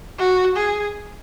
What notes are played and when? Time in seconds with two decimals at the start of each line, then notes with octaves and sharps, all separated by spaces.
0.19 F#4
0.56 G#4